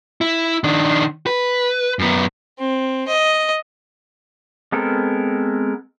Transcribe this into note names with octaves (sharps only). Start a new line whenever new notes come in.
E4
D#3 D4
B4
F#2 B3
C4
D#5
G#3 B3 C4 A4 A#4